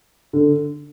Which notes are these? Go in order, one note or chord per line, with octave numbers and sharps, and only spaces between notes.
D3